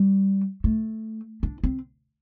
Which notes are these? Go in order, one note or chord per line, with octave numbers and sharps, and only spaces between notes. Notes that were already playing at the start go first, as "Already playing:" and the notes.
Already playing: G3
A3
D4
C4